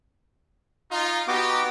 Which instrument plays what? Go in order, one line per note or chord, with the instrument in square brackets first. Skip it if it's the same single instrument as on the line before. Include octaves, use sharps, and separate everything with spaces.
[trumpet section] D#4 F4
[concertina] B3 F#4 D6 [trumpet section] D#4 G4